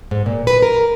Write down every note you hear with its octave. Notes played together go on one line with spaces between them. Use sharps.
G#2
A#2
B4
A#4